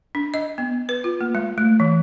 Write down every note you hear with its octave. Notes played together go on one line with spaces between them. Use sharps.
D4
D#5
B3
B4
F4
A#3
G#3
A3
E3